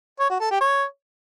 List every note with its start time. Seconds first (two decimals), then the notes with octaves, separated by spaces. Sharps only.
0.20 C#5
0.30 F#4
0.40 A4
0.51 G4
0.61 C#5